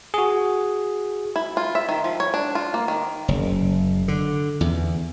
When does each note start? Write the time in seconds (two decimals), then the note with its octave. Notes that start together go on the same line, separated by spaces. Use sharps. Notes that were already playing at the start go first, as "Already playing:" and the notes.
0.14 F#4 G#4
1.36 E4
1.57 F4
1.75 E5
1.89 D#3
2.04 F3
2.20 C#5
2.34 D4
2.55 F4
2.74 A#3
2.88 D#3
3.28 F#1
4.08 D3
4.61 E2